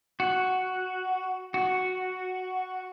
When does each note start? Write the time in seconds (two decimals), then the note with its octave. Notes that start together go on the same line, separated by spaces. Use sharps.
0.20 F#4
1.54 F#4